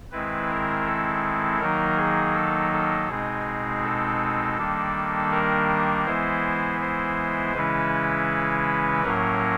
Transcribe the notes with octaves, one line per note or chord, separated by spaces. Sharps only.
D#3 G#3 C4 E4 B4
A#4
A4
D#3 F#3 A#3 D#4 A#4
G#4
A4
A4
B2 G#3 C4 D#4 G#4
A4
D#3 G3 A#3 D4
A#4
E3 G#3 B3 E4 C5
C5
C#3 E3 G#3 C#4 E4 B4
A2 F#3 A#3 C#4 A#4